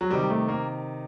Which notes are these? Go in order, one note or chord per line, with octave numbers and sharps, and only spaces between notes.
F#3
C3 D#3 G3
A3
A#3